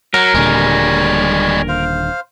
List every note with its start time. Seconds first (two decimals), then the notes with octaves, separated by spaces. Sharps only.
0.14 F#3 A#4 F#5
0.34 D#1 A#2 D3 G3 G#3 C#5
1.68 C5 F5